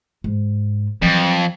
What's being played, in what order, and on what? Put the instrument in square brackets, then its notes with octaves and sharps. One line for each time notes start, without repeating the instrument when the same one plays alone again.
[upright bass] G#2
[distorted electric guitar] F2 [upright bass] E3 F#3